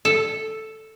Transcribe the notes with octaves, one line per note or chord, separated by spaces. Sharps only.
A4